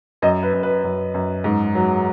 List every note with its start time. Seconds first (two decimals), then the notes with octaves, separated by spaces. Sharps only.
0.22 F#2 D#5
0.43 B4
0.53 F#2
0.63 B4
0.84 F#2
1.14 F#2
1.44 G#2
1.75 F#3